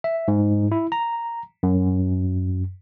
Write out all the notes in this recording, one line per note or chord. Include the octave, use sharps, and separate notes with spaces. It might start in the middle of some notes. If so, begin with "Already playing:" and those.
E5
G#2
E4
A#5
F#2